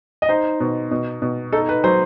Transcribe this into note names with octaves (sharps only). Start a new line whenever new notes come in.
D#5
D#4 C5
B2
B2
B2
D#4 A4
B4
F#3 C5